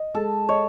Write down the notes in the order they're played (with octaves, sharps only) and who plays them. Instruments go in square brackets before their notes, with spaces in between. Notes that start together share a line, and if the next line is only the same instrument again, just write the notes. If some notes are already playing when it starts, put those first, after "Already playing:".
Already playing: [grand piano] D#5
[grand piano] G#3 [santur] A4
[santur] C#5 [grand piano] D#5